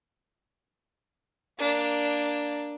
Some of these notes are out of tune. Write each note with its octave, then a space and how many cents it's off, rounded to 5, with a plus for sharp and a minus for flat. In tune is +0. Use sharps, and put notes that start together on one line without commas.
A#3 +0 D4 +0